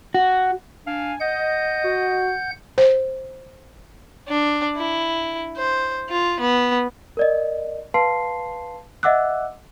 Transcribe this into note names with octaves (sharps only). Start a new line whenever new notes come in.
F#4
D4 F5 G#5
D#5 F#5 G6
F#4
C5
D4
E4
C5
F4
B3
A#4 D5 D#5
B4 F5 A5 C6 C7
D#5 E5 F#5 D6 E6 F#6